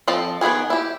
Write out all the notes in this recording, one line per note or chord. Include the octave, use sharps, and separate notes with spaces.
F3 C4 A4 D#5
D#3 B3 E4 G#4 G#5
E4 G4